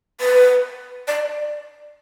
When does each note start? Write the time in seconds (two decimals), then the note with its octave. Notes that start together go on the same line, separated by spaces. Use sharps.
0.21 B4
1.08 D5